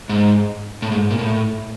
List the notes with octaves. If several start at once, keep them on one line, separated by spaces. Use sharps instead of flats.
G#2
A2
G#2
A#2
A2